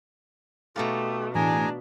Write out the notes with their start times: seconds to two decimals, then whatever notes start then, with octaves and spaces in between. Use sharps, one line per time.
0.76 B2 A3 D#4 F4 G4
1.35 A2 E3 D4 G#4 G#5 A#5